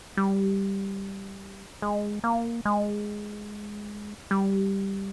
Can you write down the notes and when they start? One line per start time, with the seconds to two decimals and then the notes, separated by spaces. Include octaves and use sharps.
0.17 G3
1.82 G#3
2.24 A#3
2.65 G#3
4.31 G3